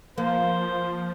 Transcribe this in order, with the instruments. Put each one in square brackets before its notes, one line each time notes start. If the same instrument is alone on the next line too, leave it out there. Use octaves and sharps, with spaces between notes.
[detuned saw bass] F3 [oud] A#3 [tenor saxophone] C5